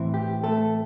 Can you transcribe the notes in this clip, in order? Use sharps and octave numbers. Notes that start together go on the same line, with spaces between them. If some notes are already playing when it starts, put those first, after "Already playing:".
Already playing: A2 E3 C4 E4
G4
A3 A4